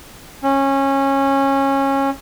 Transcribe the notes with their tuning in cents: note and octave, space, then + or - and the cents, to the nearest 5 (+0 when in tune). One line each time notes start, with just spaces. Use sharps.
C#4 -20